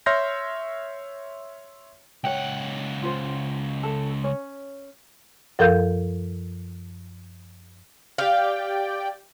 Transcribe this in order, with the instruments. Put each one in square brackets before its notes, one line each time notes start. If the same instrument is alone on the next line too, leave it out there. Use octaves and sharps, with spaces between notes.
[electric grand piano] C#5 E5 C6 F6 G6 A#6
[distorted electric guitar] C#2 F#5 [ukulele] C#5 G5
[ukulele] F4 C5
A4
C#4 C#5
[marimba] F#2 F3 A4 A#4 F5 G6
[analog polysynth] G4 D5 G5 [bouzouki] F5